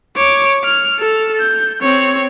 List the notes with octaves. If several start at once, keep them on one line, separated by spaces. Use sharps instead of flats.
C#5 D6
F6
A4
G6
C4 C#5